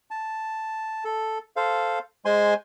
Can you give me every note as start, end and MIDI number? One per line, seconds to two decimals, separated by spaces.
0.11 1.04 81
1.05 1.38 69
1.56 1.99 69
1.56 1.99 72
1.56 1.99 77
2.25 2.54 56
2.25 2.54 72
2.25 2.54 80
2.25 2.54 84